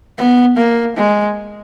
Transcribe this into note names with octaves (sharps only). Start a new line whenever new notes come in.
B3
A#3
G#3